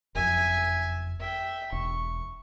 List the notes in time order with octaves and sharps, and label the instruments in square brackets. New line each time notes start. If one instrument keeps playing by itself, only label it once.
[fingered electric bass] F#1 F2 [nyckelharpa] E5 G#5
[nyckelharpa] E5 G5
[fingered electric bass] E1 [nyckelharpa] C#6